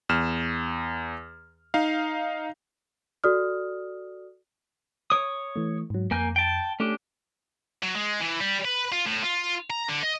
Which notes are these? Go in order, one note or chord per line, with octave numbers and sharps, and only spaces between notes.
E2 F6 E7
D#4 F5
F#4 A4 D5 D#6 F6
C#5 D#6
E3 A3
G#2 F#3
F2 A#3 G#5 G6
G5 A5
A3 C#4 D4 G4
F#3
G#3
E3
G3
B4
F4
A2
F4
A#5
D3
D#5